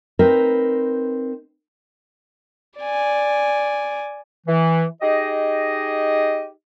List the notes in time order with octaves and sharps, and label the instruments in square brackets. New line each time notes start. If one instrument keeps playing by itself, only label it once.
[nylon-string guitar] C4 D#4 A#4 B4
[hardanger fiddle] D5 G#5
[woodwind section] E3
D#4 G4 G#4 D#5